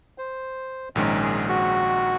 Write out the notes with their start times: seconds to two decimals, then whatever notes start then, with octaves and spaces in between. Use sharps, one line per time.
0.18 C5
0.95 A#1 G#2 D#3 G#3 C#4 A#4
1.22 G#4
1.49 F#4